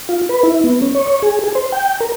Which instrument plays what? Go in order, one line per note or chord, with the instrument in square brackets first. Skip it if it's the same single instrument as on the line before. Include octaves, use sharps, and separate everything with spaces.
[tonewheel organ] F4
B4
E4
B3
C#4
C#5
C#5
G#4
G#4
C5
G5
A#4